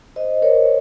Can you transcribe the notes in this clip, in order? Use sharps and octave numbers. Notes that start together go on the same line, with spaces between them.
C5 D#5
A#4 C#5